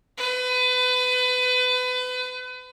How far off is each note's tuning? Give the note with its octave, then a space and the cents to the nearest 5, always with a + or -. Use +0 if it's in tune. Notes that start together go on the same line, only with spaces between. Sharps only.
B4 +30